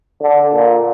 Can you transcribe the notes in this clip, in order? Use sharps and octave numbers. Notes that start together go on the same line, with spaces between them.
D3
A#2